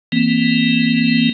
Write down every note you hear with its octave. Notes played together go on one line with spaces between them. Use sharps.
E3 A#3 C4